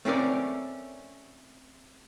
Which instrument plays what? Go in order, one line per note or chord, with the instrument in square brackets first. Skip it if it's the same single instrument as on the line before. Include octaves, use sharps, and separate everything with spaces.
[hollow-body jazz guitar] A3 C4 C#4 A#4 D5